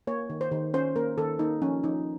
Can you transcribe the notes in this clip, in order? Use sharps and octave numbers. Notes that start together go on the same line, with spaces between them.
A#3 C#5
D#3
C5
D#3
C#4 C5
A#3 A#4
D#3 A4
A#3 D#4
F3 C#4
F3 D#4